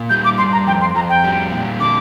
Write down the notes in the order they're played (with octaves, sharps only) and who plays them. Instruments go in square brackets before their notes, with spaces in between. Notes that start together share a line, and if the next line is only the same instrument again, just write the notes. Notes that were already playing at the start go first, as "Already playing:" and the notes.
Already playing: [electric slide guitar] A#2
[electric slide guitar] G3 [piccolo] G6
[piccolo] D6
[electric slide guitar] G2 [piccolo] C6
[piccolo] A#5
[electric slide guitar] F2 [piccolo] G5
[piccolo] C6
[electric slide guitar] F2 [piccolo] A#5
[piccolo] G5
[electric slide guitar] G3
A#2
[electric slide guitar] D3 [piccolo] D6